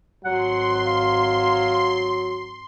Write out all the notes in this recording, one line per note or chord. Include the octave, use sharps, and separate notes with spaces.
G#1 F#3 F#5 C6
F5